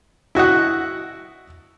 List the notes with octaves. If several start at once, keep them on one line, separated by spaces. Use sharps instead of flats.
E4 F#4 D#5 F#5